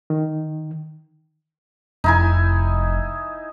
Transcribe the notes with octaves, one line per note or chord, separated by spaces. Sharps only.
D#3
F1 D#4 E4 G#5